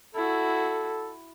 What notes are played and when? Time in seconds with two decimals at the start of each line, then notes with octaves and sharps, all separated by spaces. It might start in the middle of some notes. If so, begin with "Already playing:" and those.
0.15 E4 F#4 A4